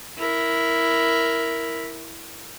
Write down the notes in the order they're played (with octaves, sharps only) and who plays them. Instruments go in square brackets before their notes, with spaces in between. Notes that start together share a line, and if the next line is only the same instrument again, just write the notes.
[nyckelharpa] E4 A#4